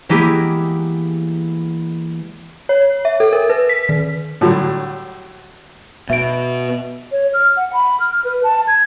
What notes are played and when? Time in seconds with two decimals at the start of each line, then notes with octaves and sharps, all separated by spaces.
0.09 E3 G#3 A#3 B3 E4 G4
2.69 C#5
3.05 E5
3.20 A4
3.32 A#4
3.50 B4
3.69 B6
3.89 D#3
4.41 A2 D3 F#3 G3
6.10 B2 E5 D7
7.12 C#5
7.34 F6
7.57 F#5
7.73 B5
8.00 F6
8.24 B4
8.44 A5
8.68 G#6